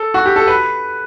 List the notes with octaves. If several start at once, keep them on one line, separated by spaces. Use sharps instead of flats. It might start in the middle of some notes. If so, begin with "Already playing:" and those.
Already playing: A4
F#4
G4
A4
B4